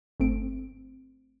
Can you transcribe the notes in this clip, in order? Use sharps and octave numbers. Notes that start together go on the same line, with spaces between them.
G1 A3 C4 D7